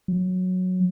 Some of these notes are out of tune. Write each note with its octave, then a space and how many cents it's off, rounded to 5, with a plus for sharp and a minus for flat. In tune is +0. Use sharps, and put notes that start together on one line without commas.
F#3 -10